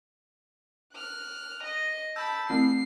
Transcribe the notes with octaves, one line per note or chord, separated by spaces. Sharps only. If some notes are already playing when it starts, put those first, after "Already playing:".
F6 F#6
D#5
A5 B5 E6 G6
A3 C4 E4 C7